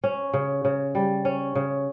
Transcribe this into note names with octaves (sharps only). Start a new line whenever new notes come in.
C#4
C#3
C#3
G3
C#4
C#3